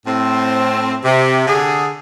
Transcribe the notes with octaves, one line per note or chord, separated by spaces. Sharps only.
A2 C4
C3
D3 G#4